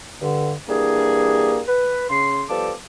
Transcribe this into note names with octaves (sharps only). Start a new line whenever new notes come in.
G2 D3
E3 G3 A#3 D4 G#4
B4
C#3 C6
F3 G3 B3 A4 A5 D6